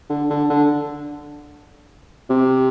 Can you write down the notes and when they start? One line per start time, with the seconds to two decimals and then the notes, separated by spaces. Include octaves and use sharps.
0.10 D3
0.30 D3
0.50 D3
2.30 C3